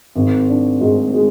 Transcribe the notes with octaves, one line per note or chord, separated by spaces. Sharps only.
G#1
D4
G#2
G#3